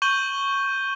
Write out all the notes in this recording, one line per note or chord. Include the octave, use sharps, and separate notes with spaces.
C#6 G6 D#7 F#7 G7